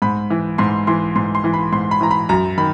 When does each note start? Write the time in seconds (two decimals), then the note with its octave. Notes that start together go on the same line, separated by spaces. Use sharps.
0.02 G#2 B5
0.30 E3
0.58 G#2 C6
0.87 E3 C6
1.16 G#2 C6
1.35 C6
1.44 E3
1.53 B5
1.72 G#2 C6
1.91 B5
2.01 E3 A#5
2.11 B5
2.29 F#2 A#5
2.58 D#3 B5